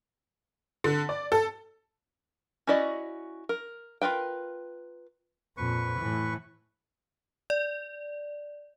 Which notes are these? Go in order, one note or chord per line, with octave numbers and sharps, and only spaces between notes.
D3
D5
A4
C#4 E4 F#4 D5 D#5
A#4
F4 A#4 B4 G5
F2 A#2 B4 C#6
A2 E3
D5